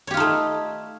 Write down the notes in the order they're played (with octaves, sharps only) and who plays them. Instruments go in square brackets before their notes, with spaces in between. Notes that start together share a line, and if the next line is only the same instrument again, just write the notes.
[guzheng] C#5
G4
F4
D#4
A3